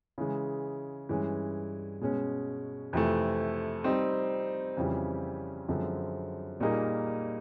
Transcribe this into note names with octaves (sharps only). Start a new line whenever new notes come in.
C#3 E3 G#3
G2 E3 G#3 C#4
B2 G#3 C#4
F2 C3 E3 A3
G3 C4 D#4
F2 C#3 E3 G3
F#2 D3 F3 G#3 C4
A#2 G3 A#3 D#4 G#4